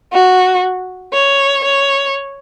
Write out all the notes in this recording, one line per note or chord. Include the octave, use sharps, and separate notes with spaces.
F#4
C#5
C#5